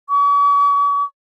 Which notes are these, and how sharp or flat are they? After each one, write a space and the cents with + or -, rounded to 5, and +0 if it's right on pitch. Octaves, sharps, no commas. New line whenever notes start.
C#6 +45